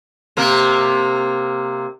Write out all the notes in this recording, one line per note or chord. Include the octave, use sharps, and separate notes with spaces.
C3 A#3 A#4